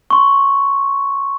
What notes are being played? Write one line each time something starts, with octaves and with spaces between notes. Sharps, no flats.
C6 C#6